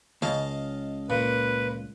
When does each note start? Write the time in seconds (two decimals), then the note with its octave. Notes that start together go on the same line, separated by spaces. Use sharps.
0.22 C#2 D#5 F5 A5
1.10 A#2 B4